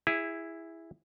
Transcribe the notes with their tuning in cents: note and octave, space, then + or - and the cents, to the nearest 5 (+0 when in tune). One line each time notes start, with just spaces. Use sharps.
E4 +0 G#4 -20